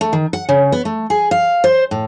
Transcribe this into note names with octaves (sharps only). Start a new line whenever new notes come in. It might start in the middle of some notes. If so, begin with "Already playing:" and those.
A3
D#3
F#5
C#3
B3
A3
G#4
F5
C5
A2